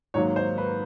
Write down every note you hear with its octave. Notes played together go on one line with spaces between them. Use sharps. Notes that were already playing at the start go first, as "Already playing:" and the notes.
G#2 D#3 F#3 A#3 C#5
C5
B4